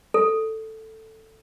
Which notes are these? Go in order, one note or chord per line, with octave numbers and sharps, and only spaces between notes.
A4